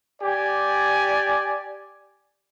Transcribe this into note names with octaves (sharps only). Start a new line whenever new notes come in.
G4 D5 G#5